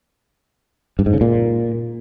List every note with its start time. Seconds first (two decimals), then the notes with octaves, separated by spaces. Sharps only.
0.99 G2
1.06 G#2
1.14 C#3
1.21 A#2